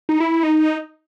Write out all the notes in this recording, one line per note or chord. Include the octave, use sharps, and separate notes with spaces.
D#4
E4
E4
D#4